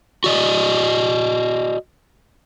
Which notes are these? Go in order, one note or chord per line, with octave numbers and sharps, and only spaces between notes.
F#4 D5 D#5